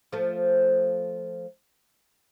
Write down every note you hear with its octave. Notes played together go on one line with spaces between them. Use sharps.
F3 A3